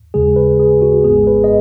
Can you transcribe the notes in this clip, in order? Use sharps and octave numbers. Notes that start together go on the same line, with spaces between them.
D#2 C#3 G#3 G#4
B4
G#4
F#4
G#1 G#2 G#3 B3 G#4
B4
D#5